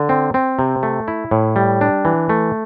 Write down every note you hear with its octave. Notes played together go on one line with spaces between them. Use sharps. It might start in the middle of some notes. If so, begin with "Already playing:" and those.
Already playing: D3
C4
C4
C3
A3
E4
A2
G3
D4
E3
A3